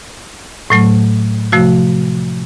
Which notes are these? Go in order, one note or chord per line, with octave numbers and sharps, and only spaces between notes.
A2 F#3 A3
C3 F3 A3 F#4